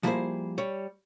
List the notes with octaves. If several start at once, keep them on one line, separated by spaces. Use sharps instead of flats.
F3 G3 A#3 E4 G#4 C5
G3 C#5